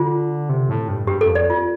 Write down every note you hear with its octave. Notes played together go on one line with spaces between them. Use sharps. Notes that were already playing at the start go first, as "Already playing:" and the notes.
Already playing: D3 F4
C3
A2
G2
G2 G4
F2 A4
D5
F4